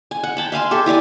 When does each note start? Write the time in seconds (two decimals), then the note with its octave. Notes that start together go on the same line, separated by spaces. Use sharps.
0.11 G#5
0.23 F#5
0.37 G5 A5 B5
0.52 E5 F5 G#5 C6
0.71 G4 A4 E5
0.86 E4 G4 D5 G#5